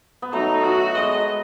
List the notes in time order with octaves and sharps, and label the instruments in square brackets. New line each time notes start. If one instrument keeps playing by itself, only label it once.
[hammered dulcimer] B3
[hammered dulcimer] F#3 A3 [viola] D#4
[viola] F#4
[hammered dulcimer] G#3 B3 [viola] D#5